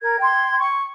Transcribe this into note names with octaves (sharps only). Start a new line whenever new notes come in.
A#4 G#6
G5 C6 G#6
C#6